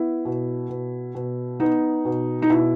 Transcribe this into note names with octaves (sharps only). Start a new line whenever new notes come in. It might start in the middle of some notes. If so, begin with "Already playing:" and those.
Already playing: B3 E4
B2
B2
B2
B3 D#4
B2
D#4
B2 E4